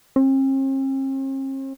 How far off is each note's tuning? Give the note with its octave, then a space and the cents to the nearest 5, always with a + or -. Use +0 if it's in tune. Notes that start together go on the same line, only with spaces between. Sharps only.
C4 +45